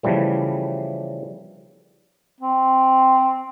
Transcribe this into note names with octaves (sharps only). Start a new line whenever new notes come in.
C#3 E3 F3 G3 A3
C4